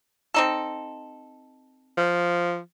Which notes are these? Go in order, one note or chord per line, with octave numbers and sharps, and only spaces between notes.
C4 D#4 A4
F3